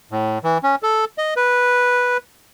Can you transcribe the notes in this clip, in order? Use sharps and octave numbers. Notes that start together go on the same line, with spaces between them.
A2
E3
C#4
A4
D#5
B4